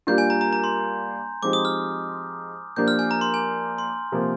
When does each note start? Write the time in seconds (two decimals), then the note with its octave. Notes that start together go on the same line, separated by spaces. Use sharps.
0.07 G3 A#3 D4 F4 G6
0.18 G#5
0.30 A#5
0.41 A#5
0.53 A#5
0.64 C6
1.43 F3 G#3 C4 D#4 G4 D6
1.53 D#6
1.65 F6
2.76 F3 A#3 D4 G4 G6
2.88 F6
2.99 G#5
3.11 A#5
3.21 C6
3.34 G#5
3.78 C6
4.12 C3 F3 A#3